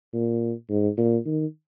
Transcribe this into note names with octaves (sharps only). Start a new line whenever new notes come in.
A#2
G#2
A#2
D#3